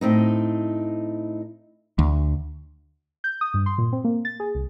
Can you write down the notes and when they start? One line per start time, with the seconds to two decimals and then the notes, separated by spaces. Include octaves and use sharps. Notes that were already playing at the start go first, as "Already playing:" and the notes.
0.01 A2 C4 D#4
1.99 D2
3.24 G6
3.41 D#6
3.54 G2
3.66 C6
3.78 A#2
3.92 C4
4.04 A#3
4.25 A6
4.40 G#4
4.55 C2